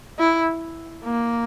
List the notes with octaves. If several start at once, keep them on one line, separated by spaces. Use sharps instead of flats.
E4
A#3